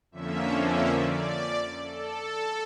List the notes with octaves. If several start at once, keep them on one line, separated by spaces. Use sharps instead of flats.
F2 D3 F3 A#3 C#4 E5
E5
D5
A4